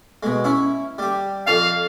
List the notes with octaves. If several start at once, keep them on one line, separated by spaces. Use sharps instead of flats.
B2 G#3
C#4 E4
G3 G4
F2 F5 A5